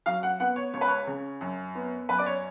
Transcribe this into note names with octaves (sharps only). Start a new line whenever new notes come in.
F#3 F5
F#5
B3 F#5
C#5
C#2 C#5
B4
C#5
C#3
F#2
B3
F#2 B4
D5
C#5